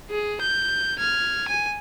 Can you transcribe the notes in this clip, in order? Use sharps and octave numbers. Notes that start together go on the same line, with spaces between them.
G#4
G6
F6 G#6
G#5